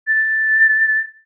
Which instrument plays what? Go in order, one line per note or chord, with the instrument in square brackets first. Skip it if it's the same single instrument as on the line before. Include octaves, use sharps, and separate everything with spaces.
[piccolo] A6